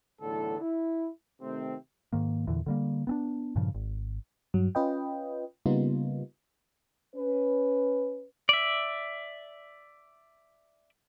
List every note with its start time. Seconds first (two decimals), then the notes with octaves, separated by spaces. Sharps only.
0.21 B1 E2 A2 D3 A4
0.60 E4
1.41 C3 D#3 A3 C4
2.13 G#2 D#3 A#3
2.47 E2 A#2 D3 E3
2.66 D3 G3 A#3
3.07 B3 C4 D4
3.56 G2 A#2 C#3 F3
3.75 G#1
4.54 G2 F#3
4.75 C#4 F4 B4 D#5 G5
5.66 C#3 G3 A#3 B3 D#4 F4
7.16 C#4 B4
8.49 D5 E5